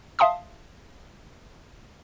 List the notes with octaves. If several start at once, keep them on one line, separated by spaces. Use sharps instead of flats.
E5 F5 A5 C6 D#6